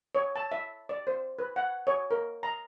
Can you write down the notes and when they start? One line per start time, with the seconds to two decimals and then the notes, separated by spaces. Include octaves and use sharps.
0.15 C#5
0.36 A5
0.52 E5
0.89 D5
1.07 C5
1.39 B4
1.56 F#5
1.87 C#5
2.11 A#4
2.43 A#5